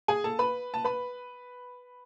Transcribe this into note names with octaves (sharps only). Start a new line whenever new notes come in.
G#4 G#5
A4 A5
B4 B5
A5
B4 B5